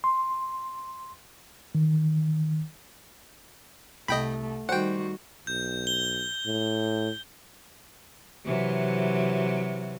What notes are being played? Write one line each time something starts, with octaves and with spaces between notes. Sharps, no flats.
C6
D#3
C2 A3 D#5 G5 B5
D#3 G3 F#4 C5 F#5 G5
B1 G6
G7
A2
C3 E3 F#3